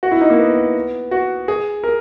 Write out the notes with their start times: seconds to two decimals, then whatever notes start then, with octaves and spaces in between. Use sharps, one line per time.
0.03 F#4
0.12 E4
0.21 D#4
0.30 A#3
0.39 B3
1.11 F#4
1.48 G#4
1.84 A#4